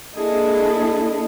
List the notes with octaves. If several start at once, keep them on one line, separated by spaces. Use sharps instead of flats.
A#3 D4 E4 G#4 A4 D#5